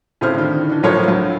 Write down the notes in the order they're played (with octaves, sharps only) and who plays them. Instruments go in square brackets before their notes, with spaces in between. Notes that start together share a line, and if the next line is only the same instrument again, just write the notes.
[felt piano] A2 C#3 C4 E4 C5 F6
D3 D#3
D3 E3
A2 F3 F#3 A#4 C5 C#5
D2 F#3